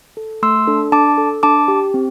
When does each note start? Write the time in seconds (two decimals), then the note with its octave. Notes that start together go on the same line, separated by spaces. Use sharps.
0.17 A4
0.43 A3 C6 E6
0.67 D4 A4
0.92 D4 A5 D6
1.18 A4
1.43 D4 A5 D6
1.68 G4
1.94 C4